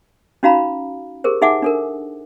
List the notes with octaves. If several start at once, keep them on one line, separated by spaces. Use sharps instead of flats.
C#4 D#4 F#4 F5 A#5 B5
G4 G#4 A#4 C5
D#4 G#4 E5 F#5 G#5 D6
D4 A4 A#4